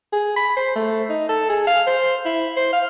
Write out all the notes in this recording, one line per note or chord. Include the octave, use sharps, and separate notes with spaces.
G#4
B5
C5
A3
D#4
A4
G#4
F5
C5
E4
C5
F5